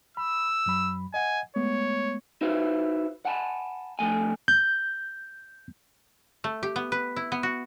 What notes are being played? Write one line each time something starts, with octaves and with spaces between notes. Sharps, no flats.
B5 E6
F#2 F#3 B5
D#5 F#5 G#5
G#3 A3 B3 C#5
D#4 E4 F#4 B4 C5
F#5 G#5 A5 B5
D3 F3 A3 G#5
G6
A3
G4
B3
B4
E4
B3
F#4